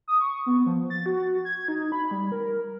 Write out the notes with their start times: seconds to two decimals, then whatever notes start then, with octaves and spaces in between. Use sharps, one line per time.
0.08 D#6
0.20 C#6
0.46 B3
0.66 F3
0.90 A6
1.06 F#4
1.45 G#6
1.68 D#4
1.92 B5
2.11 G3
2.32 A#4